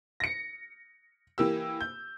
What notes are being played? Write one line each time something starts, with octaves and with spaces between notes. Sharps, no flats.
A#6 C#7
E3 A#3 G4 E6
G6